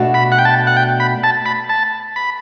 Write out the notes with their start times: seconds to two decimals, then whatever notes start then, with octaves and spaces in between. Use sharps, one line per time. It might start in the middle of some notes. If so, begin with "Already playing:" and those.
Already playing: B2 A3 D4 F#4
0.14 B5
0.32 F#5
0.38 G5
0.45 A5
0.67 F#5
0.77 G5
1.00 B5
1.24 A5
1.46 B5
1.69 A5
2.16 B5